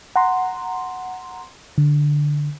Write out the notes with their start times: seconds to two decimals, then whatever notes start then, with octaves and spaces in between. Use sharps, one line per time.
0.16 F#5 A#5 C6
1.78 D3